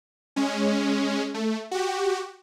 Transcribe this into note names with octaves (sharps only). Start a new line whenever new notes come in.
G#3 C#4
A3
F#4 G4